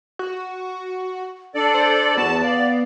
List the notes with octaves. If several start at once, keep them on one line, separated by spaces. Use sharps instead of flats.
F#4
D4 A4 D5
C5
E2 B3 F#4 A5
D5 F5